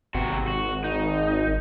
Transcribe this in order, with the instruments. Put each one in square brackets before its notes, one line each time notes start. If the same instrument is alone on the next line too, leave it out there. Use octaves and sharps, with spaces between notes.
[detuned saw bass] G#1 [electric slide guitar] C3 F#4
[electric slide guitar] F#4
D#4